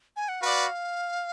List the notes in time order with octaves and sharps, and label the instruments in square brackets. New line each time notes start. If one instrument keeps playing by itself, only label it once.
[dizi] G#5
F#5
[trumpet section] F#4 B4 D5 [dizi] F5